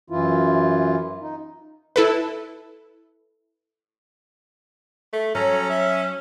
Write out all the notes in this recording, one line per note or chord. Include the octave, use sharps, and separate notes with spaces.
F#2 E3 E4 F4
D#4
E4 A4 B4
A3
F#3 C#4 A4 A#5
E5